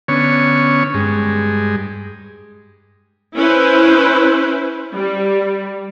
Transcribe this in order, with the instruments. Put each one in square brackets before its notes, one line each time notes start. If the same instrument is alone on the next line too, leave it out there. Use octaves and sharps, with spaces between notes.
[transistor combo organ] D3 B3 C#4 C#5
G2 G#3
[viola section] C#4 E4 B4 C5
G3